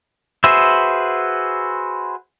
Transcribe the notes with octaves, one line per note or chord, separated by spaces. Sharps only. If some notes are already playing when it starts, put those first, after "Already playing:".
F#4 G#4 B4 C5 E5